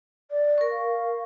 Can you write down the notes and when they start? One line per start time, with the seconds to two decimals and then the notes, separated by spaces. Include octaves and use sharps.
0.31 D5
0.58 A#4 C#6
0.71 F5